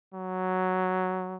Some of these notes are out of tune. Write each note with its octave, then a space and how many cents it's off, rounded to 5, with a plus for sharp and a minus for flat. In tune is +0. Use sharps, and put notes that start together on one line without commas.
F#3 +0